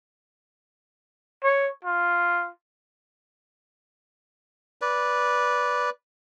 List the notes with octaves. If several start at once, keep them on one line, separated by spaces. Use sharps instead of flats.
C#5
F4
B4 D5